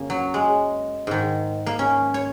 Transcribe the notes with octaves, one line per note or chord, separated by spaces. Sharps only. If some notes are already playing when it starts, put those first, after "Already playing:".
Already playing: F#2 C#3 A#3
F#3
G#3
G#2 D#3
A#3
C#4
C#5